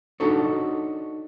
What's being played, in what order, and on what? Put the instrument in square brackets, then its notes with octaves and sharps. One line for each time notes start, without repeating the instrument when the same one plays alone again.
[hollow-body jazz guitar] D4 D#4 F#4 A4 C#5